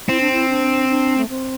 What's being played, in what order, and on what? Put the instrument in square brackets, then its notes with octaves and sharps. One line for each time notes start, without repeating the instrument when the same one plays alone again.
[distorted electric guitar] C4 [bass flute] E4
[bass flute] D4
E4
D4
D4
A3
C4